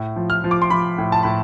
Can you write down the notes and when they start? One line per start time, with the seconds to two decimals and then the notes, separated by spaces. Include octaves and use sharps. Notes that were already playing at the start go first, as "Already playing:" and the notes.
Already playing: A2
0.16 F3
0.30 F6
0.44 F3
0.51 D6
0.62 C6
0.70 F3 B5
0.98 A2
1.12 A5
1.23 A2 B5